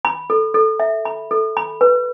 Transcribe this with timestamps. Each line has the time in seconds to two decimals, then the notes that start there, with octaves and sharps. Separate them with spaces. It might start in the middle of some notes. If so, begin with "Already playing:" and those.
0.05 B5
0.30 A4
0.54 A4
0.80 E5
1.05 B5
1.31 A4
1.57 B5
1.81 B4